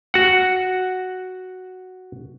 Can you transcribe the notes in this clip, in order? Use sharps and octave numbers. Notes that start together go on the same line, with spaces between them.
F#4 F#5